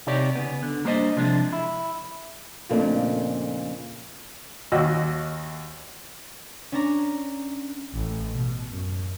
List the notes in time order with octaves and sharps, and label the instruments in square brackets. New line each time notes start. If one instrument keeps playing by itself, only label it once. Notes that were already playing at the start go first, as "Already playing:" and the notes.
[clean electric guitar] C3 D#4 G4 C#5 D5
C#3 B3
D3
G3 A#3 D4 C5 C#5 D#5
C3 F3 G#3 D4
E4
[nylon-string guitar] F2 A#2 C#3 A3 A#3 D4
[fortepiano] D#2 F#4 D#5 E6
[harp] C#4 D4 A#5
[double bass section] A1
B2
F#2